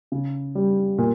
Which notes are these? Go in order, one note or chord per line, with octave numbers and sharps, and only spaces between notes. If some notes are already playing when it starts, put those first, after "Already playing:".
C#3
G3
A#2